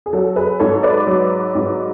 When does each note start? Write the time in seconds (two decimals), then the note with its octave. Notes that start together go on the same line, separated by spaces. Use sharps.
0.06 G#4
0.13 F#3 F#4 A4
0.36 G#4 B4
0.60 G#2 A4 C#5
0.83 B4 D5
1.07 F#3
1.55 G#2